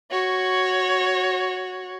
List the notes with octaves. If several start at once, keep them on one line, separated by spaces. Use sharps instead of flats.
F#4 C#5